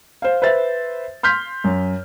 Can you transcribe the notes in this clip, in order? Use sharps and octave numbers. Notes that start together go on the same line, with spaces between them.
C5 F5
B4 C5 E5 A6
C6 F6 G6 B6
F#2